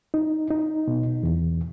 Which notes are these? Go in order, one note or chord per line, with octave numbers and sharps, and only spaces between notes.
D#4
D#4
B2
E2